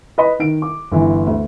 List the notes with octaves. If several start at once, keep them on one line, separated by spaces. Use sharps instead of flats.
B4 D#5 B5
D#3 D7
D6
G1 E3
D2